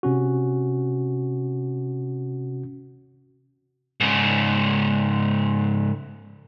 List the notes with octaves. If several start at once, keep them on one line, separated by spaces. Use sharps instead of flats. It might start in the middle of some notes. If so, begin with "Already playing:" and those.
C3 C#4 F#4
G#2 C#3